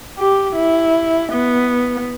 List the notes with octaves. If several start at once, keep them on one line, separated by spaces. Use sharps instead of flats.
G4
E4
B3